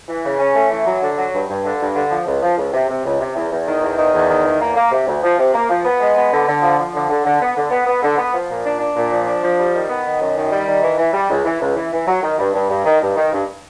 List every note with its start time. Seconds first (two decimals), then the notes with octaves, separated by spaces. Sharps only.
0.08 E3
0.24 C#3
0.39 C#4
0.55 A3
0.71 E3
0.86 F#3
1.01 D3
1.18 F#3
1.33 G2
1.49 G2
1.65 D3
1.80 G2
1.95 D3
2.11 F3
2.26 C#2
2.42 F3
2.58 C#2
2.73 C3
2.88 C3
3.04 C#2
3.20 C3
3.36 E2
3.51 E2
3.67 D#3
3.82 E2
3.97 D#3
4.13 E2
4.29 D#3
4.45 E2
4.60 A#3
4.76 A#3
4.91 C3
5.07 D2
5.23 F3
5.38 C3
5.54 A#3
5.69 F3
5.85 B3
6.00 G#3
6.15 B3
6.32 D3
6.47 D3
6.62 F3
6.78 F3
6.94 D3
7.09 D3
7.25 D3
7.41 B3
7.56 D3
7.71 B3
7.86 B3
8.02 D3
8.18 B3
8.34 F3
8.49 A#2
8.65 D4
8.80 D4
8.96 A#2
9.12 F3
9.27 D4
9.43 F3
9.58 G3
9.74 D#3
9.89 B3
10.05 D#3
10.21 F#2
10.36 D#3
10.52 G3
10.67 D#3
10.82 E3
10.98 E3
11.13 G3
11.30 C#2
11.45 E3
11.61 C#2
11.76 E3
11.92 E3
12.07 F#3
12.23 D#3
12.39 G2
12.54 G2
12.69 G2
12.85 D#3
13.01 G2
13.16 D#3
13.32 G2